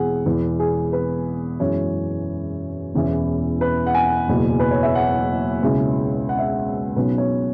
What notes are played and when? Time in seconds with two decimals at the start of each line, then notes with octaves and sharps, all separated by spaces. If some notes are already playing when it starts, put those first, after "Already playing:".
Already playing: E1 E3 G#4 F#5
0.26 E1 E2 E3 B4
0.59 G#4
0.93 B4
1.59 F#2 E3 G#3 C#4 E4 C#5
2.94 E1 E2 E3 C#4 E4
3.61 B4
3.86 F#5
3.94 G#5
4.28 F#1 E2 B2 B3
4.60 B4
4.71 C#5
4.83 E5
4.95 F#5
5.63 C#2 B2 G#3 C#4 E4
6.29 F#5
6.38 E5
6.48 F#5
6.96 B1 B2 F#3 C#4 B4
7.18 C#5